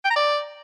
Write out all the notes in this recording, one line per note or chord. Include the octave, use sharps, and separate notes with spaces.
G5
A#5
D5